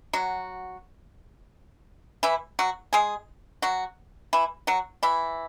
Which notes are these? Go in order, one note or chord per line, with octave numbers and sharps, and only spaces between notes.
F#3 F#4
E3 E4
F#3 F#4
G#3 G#4
F#3 F#4
E3 E4
F#3 F#4
E3 E4